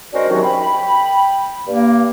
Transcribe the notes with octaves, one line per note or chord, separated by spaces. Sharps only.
G#3 C#4 D4 F#4 A#4 C5
G#2 C3 D#3 F#3 C#4 F#4
G5 B5
G2 A#3